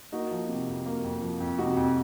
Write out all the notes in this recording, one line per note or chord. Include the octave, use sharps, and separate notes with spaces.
A#3 D#4 F#4
F3
C3
F2
A#3
F2
F3
F2
C3 D#4 F#4
F2